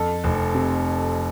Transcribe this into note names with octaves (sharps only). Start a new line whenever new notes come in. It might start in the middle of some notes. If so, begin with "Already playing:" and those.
Already playing: F2 A4
F1
C3